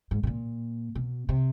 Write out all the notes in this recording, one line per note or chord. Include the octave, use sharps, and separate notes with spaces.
G#2
B2
A#2
B2
C3